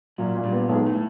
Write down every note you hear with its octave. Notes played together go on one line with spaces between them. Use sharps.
F#2 A#2 F#3
A#2
G2 G3
B3
B1 G#2 G#3
A2 A3